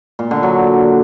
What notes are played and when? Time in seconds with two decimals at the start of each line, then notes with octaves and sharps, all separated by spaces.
0.19 A#2
0.31 D3
0.43 F#3